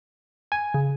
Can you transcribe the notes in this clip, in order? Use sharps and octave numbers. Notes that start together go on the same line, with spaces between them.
G#5
C#3